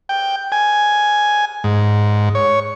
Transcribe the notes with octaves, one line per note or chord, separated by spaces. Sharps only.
G5
G#5
G#2
C#5